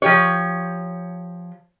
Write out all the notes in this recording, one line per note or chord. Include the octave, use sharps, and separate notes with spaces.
F3 G4 C#5